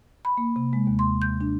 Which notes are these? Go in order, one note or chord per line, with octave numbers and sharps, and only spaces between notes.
B5
A#3
C3
G#3
D#2
C6
G6
D4